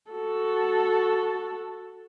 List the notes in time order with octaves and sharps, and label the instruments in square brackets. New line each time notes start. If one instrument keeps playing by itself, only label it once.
[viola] F#4 A4